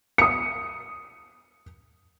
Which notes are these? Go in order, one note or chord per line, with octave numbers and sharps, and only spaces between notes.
D#6 C#7